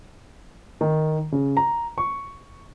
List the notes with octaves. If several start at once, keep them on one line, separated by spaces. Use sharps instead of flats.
D#3
C#3
A#5
C#6